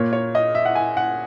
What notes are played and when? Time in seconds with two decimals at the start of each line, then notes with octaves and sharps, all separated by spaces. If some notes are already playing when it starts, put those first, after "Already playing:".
Already playing: A#2 A#3 C#5
0.13 C#5
0.35 D#5
0.55 E5
0.65 F#5
0.75 G#5
0.97 F#5